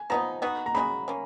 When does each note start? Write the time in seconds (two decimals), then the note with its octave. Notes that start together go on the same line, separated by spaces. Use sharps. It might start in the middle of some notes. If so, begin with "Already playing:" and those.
Already playing: G#5
0.10 F3 B3 D#4 A#5
0.42 B3 D#4 F#4
0.66 A#5
0.75 C#3 G#3 D#4 F#4 B5
1.08 A#3 C#4